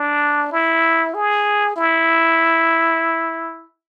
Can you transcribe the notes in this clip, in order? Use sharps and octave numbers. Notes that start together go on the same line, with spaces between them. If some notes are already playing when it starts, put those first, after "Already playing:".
Already playing: D4
E4
G#4
E4